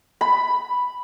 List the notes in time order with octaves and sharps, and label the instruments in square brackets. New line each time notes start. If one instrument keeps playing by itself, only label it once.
[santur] B5